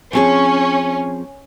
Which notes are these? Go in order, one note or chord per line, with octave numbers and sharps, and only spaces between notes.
F3 C4 C#4 G#4